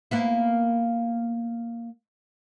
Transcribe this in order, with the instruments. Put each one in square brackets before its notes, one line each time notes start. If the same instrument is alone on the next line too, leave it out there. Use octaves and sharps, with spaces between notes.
[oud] A#3 B3 E4